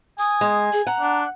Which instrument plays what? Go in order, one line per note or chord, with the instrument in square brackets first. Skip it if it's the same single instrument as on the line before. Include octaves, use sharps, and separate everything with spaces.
[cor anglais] G#5 [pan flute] D#6
[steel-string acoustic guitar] G#3
[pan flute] G#4
[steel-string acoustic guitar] F#5 [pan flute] A#5
[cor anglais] D4